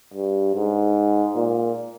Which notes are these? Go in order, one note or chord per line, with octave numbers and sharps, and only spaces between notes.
G2
G#2
A#2